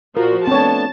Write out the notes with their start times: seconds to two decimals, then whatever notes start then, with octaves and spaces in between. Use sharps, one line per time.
0.17 A#2 F3 F#4 A#4
0.47 A3 B3 C4 D4 C#5 A5